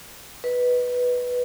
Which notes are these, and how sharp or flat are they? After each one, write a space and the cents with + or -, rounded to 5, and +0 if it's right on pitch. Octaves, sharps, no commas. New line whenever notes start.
B4 -5 D#5 +0